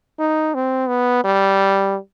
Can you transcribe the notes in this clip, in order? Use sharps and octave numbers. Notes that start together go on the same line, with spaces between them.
D#4
C4
B3
G3